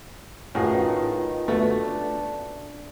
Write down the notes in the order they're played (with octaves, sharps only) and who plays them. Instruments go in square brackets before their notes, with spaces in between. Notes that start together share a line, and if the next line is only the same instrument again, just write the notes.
[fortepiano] A2 F#4 G#4 [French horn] D#3 [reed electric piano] C#4 F4 B4
[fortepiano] A3 B3 F#4 [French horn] D4